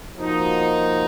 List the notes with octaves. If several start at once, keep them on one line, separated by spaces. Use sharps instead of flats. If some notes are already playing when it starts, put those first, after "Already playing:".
F3 A#3 D#4 F#4